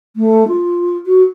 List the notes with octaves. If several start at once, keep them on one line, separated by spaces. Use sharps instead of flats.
A3
F4
F#4